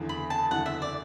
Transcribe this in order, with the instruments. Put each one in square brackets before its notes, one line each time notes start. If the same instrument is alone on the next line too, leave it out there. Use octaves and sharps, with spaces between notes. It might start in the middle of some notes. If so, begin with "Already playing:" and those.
Already playing: [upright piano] F#1 E2 D3
[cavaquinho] B5
A5
[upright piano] F#1 E2 D3 [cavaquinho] F#5
[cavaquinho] E5
D5